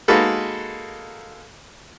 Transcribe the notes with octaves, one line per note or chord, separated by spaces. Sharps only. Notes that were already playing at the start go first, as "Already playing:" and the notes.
G#3 A#3 D#4 F#4 A4 B4